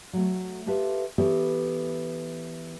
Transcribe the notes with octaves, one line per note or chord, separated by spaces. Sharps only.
F#3 A3
F4 G4 A4 B4 E5
E3 B3 G4 A4 C#5